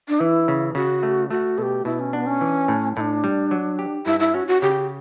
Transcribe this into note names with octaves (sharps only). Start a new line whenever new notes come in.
D4
E3 E4
C#3
C#3 F#4
A3
A3 F#4
B2 G4 A4
B2 E4
C#4
B3 D4
C#4
E3
A2
A2 D4 E4
G3
F#3
G4
G2 E4
E4
C#4 F#4
F#4
C#3 G4